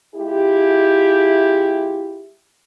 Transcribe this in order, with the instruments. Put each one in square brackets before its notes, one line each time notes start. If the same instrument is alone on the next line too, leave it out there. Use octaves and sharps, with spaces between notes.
[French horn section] G#3 E4 F4 G4